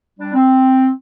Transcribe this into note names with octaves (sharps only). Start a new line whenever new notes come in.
G3 D4
C4